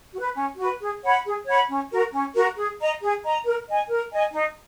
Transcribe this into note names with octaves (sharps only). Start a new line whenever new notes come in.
F#4
B4
C#4
F#4 B4
G#4
C#5 F#5 B5
G#4
C#5 F#5 B5
C#4
F#4 A#4
C#4
F#4 A#4
G#4
D#5 A#5
G#4
D#5 A#5
A#4
D#5 G#5
A#4
D#5 G#5
D#4